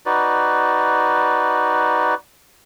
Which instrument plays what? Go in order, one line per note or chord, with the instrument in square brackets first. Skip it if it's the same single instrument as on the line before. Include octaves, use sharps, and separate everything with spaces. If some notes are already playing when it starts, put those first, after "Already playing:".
[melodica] D#4 F#4 B4 D5